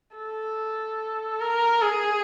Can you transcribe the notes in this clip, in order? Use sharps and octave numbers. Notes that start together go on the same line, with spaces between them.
A4
A#4
G#4